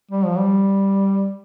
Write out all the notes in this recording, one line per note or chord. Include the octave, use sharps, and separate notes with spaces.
G3
F3
G3